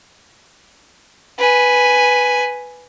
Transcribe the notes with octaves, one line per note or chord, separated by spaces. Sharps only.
B4 G#5